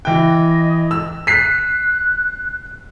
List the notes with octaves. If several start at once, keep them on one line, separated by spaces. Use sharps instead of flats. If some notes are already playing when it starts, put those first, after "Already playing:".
E3 D#5 G5
E6
F#6 B6 C7